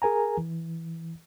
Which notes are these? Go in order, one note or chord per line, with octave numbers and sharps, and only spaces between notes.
G#4 A#4 G#5 A#5
E3